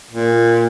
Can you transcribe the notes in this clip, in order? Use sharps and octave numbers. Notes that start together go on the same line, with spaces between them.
A#2